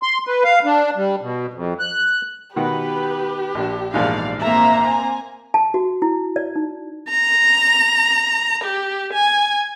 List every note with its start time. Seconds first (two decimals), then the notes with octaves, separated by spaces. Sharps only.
0.03 C6
0.27 B4
0.44 F5
0.65 D4
0.96 G3
1.21 B2
1.54 F2
1.80 F#6
2.56 B2 D#3 G4 B4 F#5
3.55 A#1 D4
3.94 A#1 E2 G#2 D5 F5
4.42 A#3 C4 E5 A#5
4.85 G#5
5.54 A5
5.74 F#4
6.02 E4
6.36 D5
6.56 D#4
7.09 A#5
8.64 G4
9.13 G#5